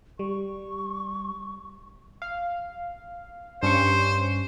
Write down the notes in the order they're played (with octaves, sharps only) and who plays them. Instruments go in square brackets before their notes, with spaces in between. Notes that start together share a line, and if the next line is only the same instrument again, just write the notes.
[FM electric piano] G3 [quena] C#6
[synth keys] F5
[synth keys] G2 C#4 C#6 [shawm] C5